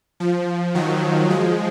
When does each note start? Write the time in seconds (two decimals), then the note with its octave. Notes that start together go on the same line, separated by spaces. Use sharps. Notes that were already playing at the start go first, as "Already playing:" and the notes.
0.20 F3
0.75 D#3 F#3
1.30 F3 G#3